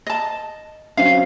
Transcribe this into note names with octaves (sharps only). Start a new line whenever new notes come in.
D#5 A5
F#3 C4 C#4 F5